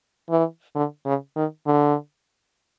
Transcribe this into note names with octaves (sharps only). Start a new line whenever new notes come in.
E3
D3
C#3
D#3
D3